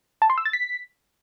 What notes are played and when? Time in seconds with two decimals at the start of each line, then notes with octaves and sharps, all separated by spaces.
0.22 A5
0.30 C6
0.38 E6
0.45 A6
0.53 B6